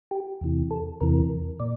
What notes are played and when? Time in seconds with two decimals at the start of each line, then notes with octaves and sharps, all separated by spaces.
0.11 G4
0.41 E2 C3 E3
0.71 A4
1.01 E2 C3 E3 A#4
1.60 A#2 D5